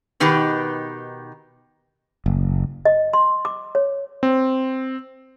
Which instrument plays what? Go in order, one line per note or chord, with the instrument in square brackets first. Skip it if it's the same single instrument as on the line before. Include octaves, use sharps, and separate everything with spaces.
[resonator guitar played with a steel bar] B2 D#3 D#4 G4 B4
[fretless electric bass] F#1
[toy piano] D#5
C6
D6
C#5
[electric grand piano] C4